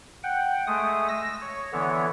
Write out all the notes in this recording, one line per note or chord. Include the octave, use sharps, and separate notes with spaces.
F#5 G5
G#3 A3 D#6
E6 A#6
C#5
D3 E3 B3 C#5